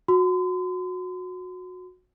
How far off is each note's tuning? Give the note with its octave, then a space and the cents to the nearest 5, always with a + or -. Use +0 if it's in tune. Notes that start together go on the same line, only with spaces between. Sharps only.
F#4 -20 C6 -40